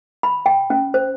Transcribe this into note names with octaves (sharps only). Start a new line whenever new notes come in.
B5
G5
C#4
C5